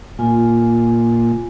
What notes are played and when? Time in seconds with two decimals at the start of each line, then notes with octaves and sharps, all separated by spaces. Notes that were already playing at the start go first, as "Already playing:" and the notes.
0.19 A#2 F4 G#5